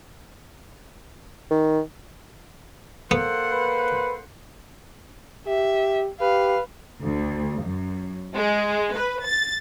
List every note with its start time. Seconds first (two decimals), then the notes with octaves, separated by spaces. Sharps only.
1.51 D#3
3.11 A#3 B3 A4 C5 F#5
3.52 B4
5.47 G4 E5
6.21 G4 B4 F5
7.03 D2
7.62 F#2
8.33 G#3
8.95 B4
9.24 A6